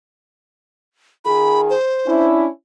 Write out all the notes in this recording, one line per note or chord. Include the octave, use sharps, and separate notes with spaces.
D#3 F4 G#4 B5
C5
C#4 D4 E4